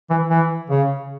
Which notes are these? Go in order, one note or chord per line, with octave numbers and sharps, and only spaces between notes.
E3
E3
C#3